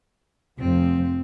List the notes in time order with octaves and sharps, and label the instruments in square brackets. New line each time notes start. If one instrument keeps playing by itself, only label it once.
[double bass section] F1 F3 [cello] C4